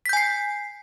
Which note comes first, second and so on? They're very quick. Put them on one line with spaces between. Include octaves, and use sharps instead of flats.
B6 G6 G#5 C7